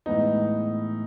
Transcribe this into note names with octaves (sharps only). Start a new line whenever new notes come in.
A2 E3 G#3 B3 D#4